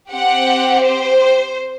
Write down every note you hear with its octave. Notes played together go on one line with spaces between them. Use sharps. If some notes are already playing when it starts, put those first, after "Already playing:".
C4 G4 F#5
C5